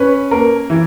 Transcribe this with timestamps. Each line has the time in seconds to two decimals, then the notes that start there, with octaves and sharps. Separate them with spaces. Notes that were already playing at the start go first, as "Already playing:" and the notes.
Already playing: C#4 B4
0.31 A#3 A#4
0.70 E3